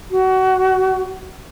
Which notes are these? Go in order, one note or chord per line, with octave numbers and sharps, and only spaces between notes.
F#4